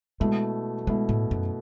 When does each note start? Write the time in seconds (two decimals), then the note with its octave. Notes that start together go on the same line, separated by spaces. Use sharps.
0.20 B2 G#3 A3 E4
0.87 B2 G#3 A3 E4
1.09 A2
1.31 F#2